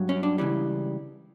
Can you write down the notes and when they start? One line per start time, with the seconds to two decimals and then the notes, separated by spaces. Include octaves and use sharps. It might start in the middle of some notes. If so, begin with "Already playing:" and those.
Already playing: G2 F#3
0.09 C#4
0.23 D4
0.38 C#2 C#3 E3 G3